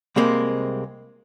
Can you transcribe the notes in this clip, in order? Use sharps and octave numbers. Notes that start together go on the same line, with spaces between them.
C2 C3 G#3 A#3 C4